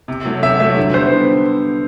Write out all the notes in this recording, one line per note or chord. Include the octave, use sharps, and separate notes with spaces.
C3
F#3 A3
C3 E5
F#3 A3 E5
D3
G3 B3 C5
D3